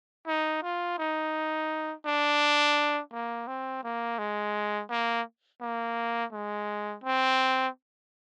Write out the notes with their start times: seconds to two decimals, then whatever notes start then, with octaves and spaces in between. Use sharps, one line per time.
0.27 D#4
0.63 F4
0.98 D#4
2.05 D4
3.12 A#3
3.47 C4
3.83 A#3
4.18 G#3
4.90 A#3
5.61 A#3
6.32 G#3
7.04 C4